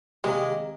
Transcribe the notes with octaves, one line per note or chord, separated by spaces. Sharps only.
C3 D#3 G#3 A#3